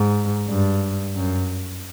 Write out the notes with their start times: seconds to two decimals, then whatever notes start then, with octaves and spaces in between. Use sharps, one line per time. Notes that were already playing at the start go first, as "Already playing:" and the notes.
Already playing: G#2
0.48 G2
1.15 F#2